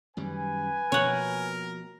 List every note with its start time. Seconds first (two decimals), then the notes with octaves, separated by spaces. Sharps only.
0.17 F#2 D#3 G3 B4 G#5
0.92 B2 F3 A#3 A#4 C#5 F#5